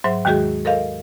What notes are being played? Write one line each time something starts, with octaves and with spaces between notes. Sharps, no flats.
G#2 F#3 C5 E5 C6
D#2 D#3 G#3 F#4 G#4 G6
A4 A#4 D#5 F5